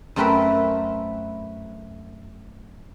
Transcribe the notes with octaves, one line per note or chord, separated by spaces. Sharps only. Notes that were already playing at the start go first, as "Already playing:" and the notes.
F#2 A3 C4 A#4 B4 E5